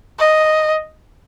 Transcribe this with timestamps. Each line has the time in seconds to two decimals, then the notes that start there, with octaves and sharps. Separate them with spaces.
0.19 D#5